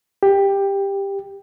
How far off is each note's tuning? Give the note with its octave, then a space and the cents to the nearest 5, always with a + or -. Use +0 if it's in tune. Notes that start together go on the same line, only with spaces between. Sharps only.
G4 +10